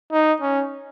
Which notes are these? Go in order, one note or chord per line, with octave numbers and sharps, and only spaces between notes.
D#4
C#4